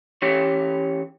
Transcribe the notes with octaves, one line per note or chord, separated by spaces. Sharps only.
E3 C#4 G4 C#5